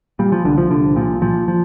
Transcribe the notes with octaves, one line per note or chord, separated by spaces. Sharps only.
A#2 G3
F3
C2 D3
F3
C2 D3
A#2 F3
A#2 F3
F3